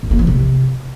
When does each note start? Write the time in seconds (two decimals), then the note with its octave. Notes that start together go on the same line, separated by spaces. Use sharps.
0.03 F#2
0.11 A#3
0.19 E3
0.27 C3